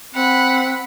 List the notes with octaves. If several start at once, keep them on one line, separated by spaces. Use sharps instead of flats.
C4 F#5 B5